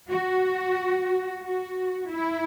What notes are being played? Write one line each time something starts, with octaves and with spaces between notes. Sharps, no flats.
F#4
F#4
E4